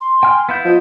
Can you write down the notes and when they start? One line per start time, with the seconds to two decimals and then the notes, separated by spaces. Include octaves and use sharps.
0.01 C6
0.23 G5 G#5 F6
0.49 B3 E4 F5 G6
0.65 F3 D#5